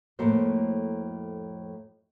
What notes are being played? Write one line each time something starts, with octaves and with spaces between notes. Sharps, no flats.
F2 A2 A#3 F#4 A4 C5